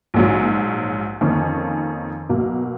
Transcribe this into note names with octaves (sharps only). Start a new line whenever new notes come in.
A#1 G#2 F#3
F2 D#3 A#3 C#4
B1 B2 A#3